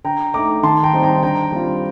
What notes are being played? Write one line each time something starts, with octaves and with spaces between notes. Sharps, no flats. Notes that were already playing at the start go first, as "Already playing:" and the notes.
D3 G5 A#5
A3 D#4 A#5 D6
D#3 A5 C6
G5 A#5
G3 C4 D#4
G5 A#5
D3 G5 A#5
G3 C4 F4